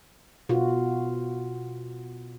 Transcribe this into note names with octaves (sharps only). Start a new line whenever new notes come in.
B2 F4 F#4